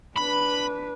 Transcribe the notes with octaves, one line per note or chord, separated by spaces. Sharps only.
D4 B4 B5